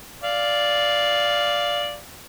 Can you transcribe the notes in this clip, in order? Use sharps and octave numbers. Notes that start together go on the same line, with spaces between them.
D5 F5